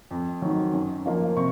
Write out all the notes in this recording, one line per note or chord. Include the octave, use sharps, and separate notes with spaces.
F2
D#3 F#3
F#2
F3 A#3
C3 C#6